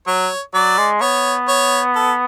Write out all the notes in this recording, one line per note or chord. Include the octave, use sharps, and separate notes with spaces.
F#3 C#5
F#3 D5
G#3
B3 C#5
C#5
A4